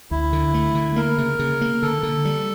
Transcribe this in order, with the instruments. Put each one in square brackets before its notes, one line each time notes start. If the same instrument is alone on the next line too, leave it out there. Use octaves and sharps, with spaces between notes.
[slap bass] D2 [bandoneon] E4
[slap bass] D3
A3
D3
[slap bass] A#3 [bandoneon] A#4
[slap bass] C#3
C#3
A#3
[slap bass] D3 [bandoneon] A4
[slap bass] D3
G3